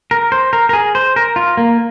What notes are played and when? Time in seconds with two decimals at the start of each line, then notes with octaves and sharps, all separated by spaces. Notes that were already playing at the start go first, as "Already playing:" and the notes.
0.11 A#4
0.32 C5
0.53 A#4
0.69 A#4
0.73 G#4
0.95 C5
1.16 A#4
1.36 F4
1.57 A#3